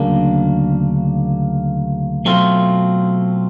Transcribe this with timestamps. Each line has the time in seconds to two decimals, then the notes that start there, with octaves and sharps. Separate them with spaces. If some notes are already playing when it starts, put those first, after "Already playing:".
Already playing: D2 C#3 F#3 A#3 D4
2.25 B2 F#3 A3 C4 F4